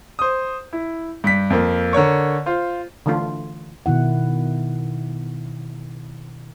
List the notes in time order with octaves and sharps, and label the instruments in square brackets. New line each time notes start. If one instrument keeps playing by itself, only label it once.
[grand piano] C5 D#6
E4
G2 B6
F2 A#3
D3 A#4 C#5 C#6
F4 C5
[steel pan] D3 E3 A3 D4 F4
[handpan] B2 D#3 E4 F#5